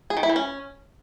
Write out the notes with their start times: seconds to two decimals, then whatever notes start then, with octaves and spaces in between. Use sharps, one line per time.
0.10 G#4
0.17 D#3
0.23 E4
0.29 E3
0.36 C#4